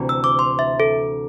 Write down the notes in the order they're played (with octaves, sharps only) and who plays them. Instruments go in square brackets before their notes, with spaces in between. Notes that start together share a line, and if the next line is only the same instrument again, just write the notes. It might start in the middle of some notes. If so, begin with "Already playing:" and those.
Already playing: [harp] D2 C3 E3
[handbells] E6
D6
C6
E5
A4